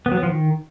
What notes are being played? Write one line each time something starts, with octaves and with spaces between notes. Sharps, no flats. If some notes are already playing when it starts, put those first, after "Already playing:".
B3
F#3
B3
F3
D#3